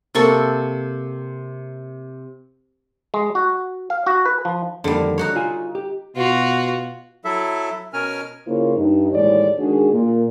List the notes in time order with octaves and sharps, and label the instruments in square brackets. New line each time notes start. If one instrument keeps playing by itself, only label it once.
[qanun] C3 A#3 A4 C#6
[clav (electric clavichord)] G#3
F#4
F5
F#4
B4
F3
[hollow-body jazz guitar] F2 D#3 A#3 [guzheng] D3 G3
[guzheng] D#4 F#4 C#5
[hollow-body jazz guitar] F4 G#5
G4
[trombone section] B2 [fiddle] F4 F#4
[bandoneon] F#3 E4 A4 E5
B2 C#4 A#4 G#5 F6
[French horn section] C#3 A#3 E4 F4 C5 C#5
G2 D#4
D#2 A2 E3 G#3 C#5 D5
D#3 G#3 D4 F#4 G#4
A#2